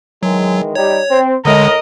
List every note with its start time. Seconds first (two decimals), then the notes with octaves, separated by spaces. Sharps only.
0.23 D#3 E3 F#3 G#3
0.75 G3 D#4 G4 C#5
1.09 C4
1.45 A2 D3 G#3 A#4 D#5